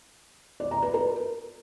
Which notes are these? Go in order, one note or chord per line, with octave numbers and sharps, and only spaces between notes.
D5
A#5
B4
A#4